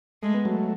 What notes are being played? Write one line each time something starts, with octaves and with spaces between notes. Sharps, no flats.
G#3 A3
B3
F#3 A3